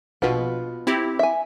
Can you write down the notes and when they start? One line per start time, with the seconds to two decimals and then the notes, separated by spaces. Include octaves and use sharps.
0.22 A#1 B2 B3 F4 B4
0.87 C4 E4 G4
1.19 E5 G#5